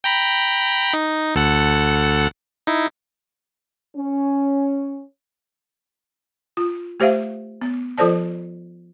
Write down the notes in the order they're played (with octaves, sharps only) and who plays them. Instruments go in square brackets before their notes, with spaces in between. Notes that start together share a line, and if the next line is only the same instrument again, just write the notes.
[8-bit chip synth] G5 A#5 B5
D#4
D2 A4 F#5
D#4 E4
[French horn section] C#4
[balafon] F4
A3 G4 C5 E5 F5
B3
F3 F4 A4 C5 D5 A5